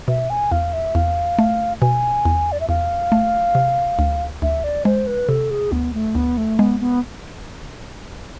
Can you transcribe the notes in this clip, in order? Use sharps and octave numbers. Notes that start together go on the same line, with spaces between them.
B2 E5
G#5
E2 F5
E5
E2 F5
A3
B2 G#5
E2
D5
E5
E2 F5
A3
C3
D2
D2 E5
D5
G#3 C5
B4
C3 A4
G#4
D2 B3
A3
D2 B3
A3
G#3 B3
B3